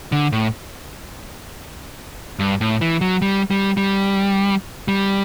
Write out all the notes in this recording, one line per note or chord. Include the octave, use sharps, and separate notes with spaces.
D3
A2
G2
A2
E3
F#3
G3
G3
G3
G3